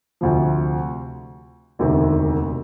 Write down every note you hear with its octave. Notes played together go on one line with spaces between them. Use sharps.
D2 C3 F3
E1 D2 C3 D#3